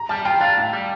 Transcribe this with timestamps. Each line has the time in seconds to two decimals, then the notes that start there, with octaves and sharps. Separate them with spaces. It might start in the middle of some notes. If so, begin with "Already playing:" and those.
Already playing: A#5
0.09 G3 A5
0.25 F4 G5
0.41 D4 F5
0.57 A2
0.73 G3